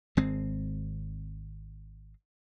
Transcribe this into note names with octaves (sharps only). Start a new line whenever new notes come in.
G#1 G#3 C4